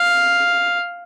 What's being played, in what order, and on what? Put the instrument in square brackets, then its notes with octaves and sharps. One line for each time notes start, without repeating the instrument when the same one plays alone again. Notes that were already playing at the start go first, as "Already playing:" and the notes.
Already playing: [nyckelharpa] F5